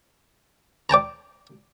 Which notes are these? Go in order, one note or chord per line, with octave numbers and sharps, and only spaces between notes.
D5 G5 A5 A#5